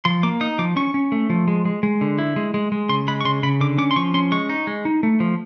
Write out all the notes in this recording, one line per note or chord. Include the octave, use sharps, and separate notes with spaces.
F3 C6
A#3 D6
D#4 D#6
F3 D6
C#4 C#6
C#4
A3
F3
G#3
G#3
G#3
D3
E4
G#3
G#3
G#3
C#3 C6
G#3 B5
C#6
C#3 C6
C#3 B5
D3 D6
C#4 D6
C6
F3 C#6
C#4 C6
G#3 C#6
D#4
G#3
D#4
A3
F3